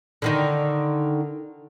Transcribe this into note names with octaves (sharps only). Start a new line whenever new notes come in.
D3 D#3 D#4